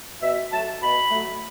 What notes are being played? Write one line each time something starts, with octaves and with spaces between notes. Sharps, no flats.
B2 E5
F#3 A3 A5
B2 B5
F#3 A3